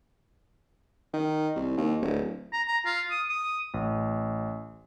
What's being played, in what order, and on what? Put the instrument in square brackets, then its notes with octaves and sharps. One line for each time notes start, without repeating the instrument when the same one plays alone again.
[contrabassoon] D#3
C2
D#2
D1
[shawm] A#5
A#5
F4
D#6
D#6
[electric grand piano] A1